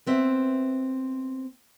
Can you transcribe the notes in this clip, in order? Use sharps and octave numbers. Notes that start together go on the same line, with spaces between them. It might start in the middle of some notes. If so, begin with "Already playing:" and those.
B3 C4 E5